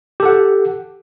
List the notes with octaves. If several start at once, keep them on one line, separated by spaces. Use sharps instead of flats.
G4 A4 F#5